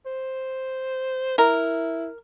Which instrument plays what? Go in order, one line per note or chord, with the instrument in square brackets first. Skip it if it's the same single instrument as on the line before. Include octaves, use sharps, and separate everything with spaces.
[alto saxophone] C5
[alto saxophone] E4 [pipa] A#4